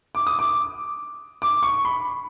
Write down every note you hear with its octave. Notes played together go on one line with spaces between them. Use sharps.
D6
D#6
D6
D6
C#6
B5